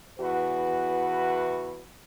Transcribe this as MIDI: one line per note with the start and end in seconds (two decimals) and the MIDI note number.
0.20 1.85 40
0.20 1.85 66
0.20 1.85 71